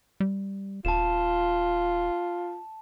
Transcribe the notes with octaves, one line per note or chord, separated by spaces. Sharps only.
G3
D#1 F4 A5 E7